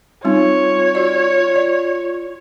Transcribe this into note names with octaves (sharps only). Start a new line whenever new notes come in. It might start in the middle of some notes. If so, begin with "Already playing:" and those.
G3 C4 D#4 F4 C#5
F#4 D5
D5